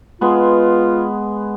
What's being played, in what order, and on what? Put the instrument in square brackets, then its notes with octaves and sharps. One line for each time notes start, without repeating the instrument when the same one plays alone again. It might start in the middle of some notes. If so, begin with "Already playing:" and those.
[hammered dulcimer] G#3 B3 [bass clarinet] F4